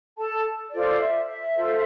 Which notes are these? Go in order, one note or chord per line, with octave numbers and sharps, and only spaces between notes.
A4 A5
F4 A4 C5 D5
E5
E5
F4 A4 C5